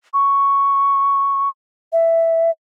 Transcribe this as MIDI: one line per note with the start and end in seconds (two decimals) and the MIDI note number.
0.14 1.49 85
1.93 2.51 76